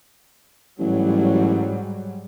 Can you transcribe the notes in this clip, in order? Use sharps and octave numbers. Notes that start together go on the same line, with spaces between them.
A1 G#2 F#3 G3